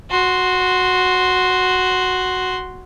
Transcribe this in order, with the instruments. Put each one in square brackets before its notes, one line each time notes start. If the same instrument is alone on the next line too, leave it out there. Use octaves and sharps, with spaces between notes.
[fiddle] F#4 C6